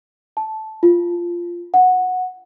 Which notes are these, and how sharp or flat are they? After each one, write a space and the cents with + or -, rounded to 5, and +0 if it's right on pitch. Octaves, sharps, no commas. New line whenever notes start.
A5 -10
F4 -10
F#5 -10